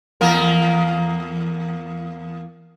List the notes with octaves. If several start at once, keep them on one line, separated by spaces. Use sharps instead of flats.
E2 A#3 A#4